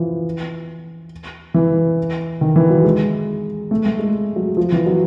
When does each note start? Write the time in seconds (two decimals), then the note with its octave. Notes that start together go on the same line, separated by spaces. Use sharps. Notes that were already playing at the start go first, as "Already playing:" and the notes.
Already playing: E3 F3
1.54 E3
2.41 D#3
2.56 E3
2.70 F#3
2.84 G#3
3.71 A3
3.86 A3
3.99 G#3
4.36 F#3
4.57 F3
4.72 E3
4.86 F#3